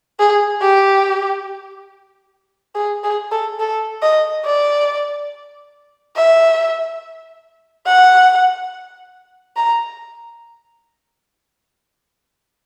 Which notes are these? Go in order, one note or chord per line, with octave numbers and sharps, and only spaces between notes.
G#4
G4
G#4
G#4
A4
A4
D#5
D5
E5
F#5
A#5